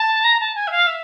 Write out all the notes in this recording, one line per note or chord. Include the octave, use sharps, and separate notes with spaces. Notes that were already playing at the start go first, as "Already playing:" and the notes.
Already playing: A5
A#5
A5
G#5
E5
F5
E5